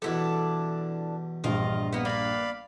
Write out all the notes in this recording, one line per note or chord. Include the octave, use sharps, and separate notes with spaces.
E2 B2 G3 D4 E4 A4
A#1 G2 F4 A#4 D#5
A#3 B3
A#3 B4 D5 F5 B5